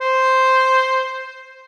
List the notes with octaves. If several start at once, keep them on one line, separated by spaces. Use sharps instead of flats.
C5